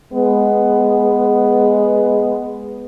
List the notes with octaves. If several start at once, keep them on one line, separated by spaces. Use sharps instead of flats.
G#3 B3